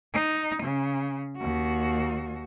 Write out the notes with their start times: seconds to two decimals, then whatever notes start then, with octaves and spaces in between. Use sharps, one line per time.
0.14 D#4
0.62 C#3
1.37 D#2 F#4